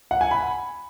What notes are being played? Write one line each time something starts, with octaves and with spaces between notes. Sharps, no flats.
F#5
G#5
B5